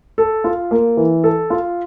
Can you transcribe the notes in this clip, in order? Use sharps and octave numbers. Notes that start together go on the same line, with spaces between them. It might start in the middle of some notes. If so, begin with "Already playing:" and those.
A4
F4
A#3
E3
A4
F4